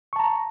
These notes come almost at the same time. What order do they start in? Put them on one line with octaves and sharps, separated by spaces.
C#6 A5 A#5